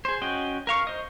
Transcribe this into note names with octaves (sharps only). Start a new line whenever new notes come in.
G#4 C5
C#4 F#4 D#5 G5
A#4 F5 C#6
C5 D#5